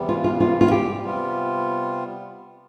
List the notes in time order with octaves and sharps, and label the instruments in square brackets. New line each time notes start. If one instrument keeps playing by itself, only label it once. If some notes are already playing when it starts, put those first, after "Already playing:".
Already playing: [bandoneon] E2 C3 E3 G3 B3
[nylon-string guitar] F4
F4
F4
F4
G4
[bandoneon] C3 G3 B3 F4